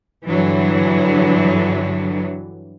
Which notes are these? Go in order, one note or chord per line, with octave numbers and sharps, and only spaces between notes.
G2 D3 E3 F#3